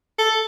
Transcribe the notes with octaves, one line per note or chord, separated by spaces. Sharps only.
A4